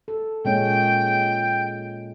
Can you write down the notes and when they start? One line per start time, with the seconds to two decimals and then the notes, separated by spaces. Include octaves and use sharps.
0.08 A4
0.45 A#2 G#3 C#4 G5